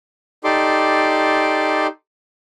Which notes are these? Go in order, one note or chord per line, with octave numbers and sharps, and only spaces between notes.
D#4 G4 A4 D5 C6 D6